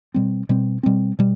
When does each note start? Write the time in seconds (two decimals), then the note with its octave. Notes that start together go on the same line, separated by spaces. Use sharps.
0.14 B2 G3 C4
0.49 B2 G3 C4
0.83 B2 G3 C4
1.19 B2 G3